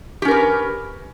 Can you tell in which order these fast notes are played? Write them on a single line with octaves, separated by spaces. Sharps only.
G4 C#4 A#4 B4